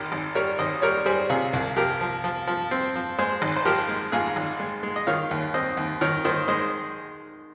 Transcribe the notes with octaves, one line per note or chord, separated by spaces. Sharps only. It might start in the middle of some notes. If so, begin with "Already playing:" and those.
Already playing: G#1 G4 A#4
G#1
G3 A#4 C#5
G#1 C5 D#5
G3 A#4 C#5
G3 G#4 C5
C3 F4 G#4
C2
F3 G4 A#4
F3
F3
F3
C4
F3
G#3 G#4 C5
G#1
C5
F3 G4 A#4
G#3
G#2 F4 G#4
G#1
G#3
G#3
D#5
D#3 C#5 F5
D#2
C4 C5 D#5
D#2
D#3 A#4 C#5
D#3 C5 D#5
G#3 C5 D#5